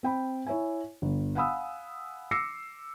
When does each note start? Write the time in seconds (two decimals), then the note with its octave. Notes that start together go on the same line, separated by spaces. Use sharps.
0.03 C4 G5 B5
0.47 E4 C#5 E5 G#5
1.02 G1
1.35 F5 F#5 G#5 B5 D#6 E6
2.31 D6 E6 A#6 C7 C#7